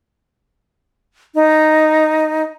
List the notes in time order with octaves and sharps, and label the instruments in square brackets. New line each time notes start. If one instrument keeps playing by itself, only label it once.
[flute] D#4